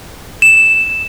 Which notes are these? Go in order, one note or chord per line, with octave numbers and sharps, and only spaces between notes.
E7